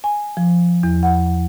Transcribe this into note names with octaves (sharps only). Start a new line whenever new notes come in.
G#5
F3
E2
F#5